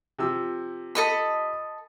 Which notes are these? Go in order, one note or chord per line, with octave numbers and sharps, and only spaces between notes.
C3 F3 E6
A4 D#5 B5